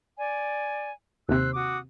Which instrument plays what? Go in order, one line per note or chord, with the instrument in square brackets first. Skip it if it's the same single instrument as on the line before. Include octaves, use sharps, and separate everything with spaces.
[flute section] D5 G#5
[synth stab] D#2 C3 [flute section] C5 E6 F#6
[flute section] F#4 D6 D#6